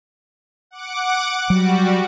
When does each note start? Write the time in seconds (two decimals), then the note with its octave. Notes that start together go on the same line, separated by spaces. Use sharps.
0.71 F#5 D6
1.50 F#3 G3 F#4